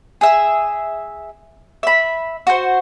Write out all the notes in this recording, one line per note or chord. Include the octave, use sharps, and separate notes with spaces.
G#4 E5
E5 B5
F#4 C5